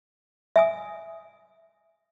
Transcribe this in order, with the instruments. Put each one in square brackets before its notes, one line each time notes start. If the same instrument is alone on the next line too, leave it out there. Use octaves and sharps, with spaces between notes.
[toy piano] E5 G#5 D#6